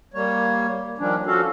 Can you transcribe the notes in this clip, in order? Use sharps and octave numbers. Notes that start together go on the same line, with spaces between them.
G3 A#3 C#5
D#3 F3 G3 C#4 D4
F3 C#4 F#4 A4 F5